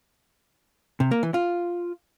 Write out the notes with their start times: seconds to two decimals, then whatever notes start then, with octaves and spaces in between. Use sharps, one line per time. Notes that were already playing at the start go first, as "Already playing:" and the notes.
1.00 C3
1.11 A#3
1.23 E3
1.34 F4